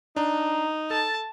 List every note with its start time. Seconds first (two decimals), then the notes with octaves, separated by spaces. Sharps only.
0.16 D4 D#4 A#5
0.90 A4 A5 A6